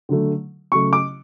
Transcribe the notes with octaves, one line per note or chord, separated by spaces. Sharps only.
D3 F#3 A3
C#3 F#3 A3 C#6
D6